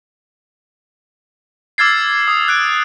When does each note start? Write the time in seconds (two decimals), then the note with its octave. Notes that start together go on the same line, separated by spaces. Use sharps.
1.78 D6 E6 F6 G#6 A6 C7
2.28 D#6
2.48 F#6 D7